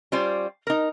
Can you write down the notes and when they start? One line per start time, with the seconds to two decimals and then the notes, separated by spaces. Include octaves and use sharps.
0.12 G3 C#4 F4 C5 D5
0.67 D#4 A#4